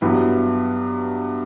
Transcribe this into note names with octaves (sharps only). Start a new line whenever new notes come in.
G2 F#3 B3 E4 B4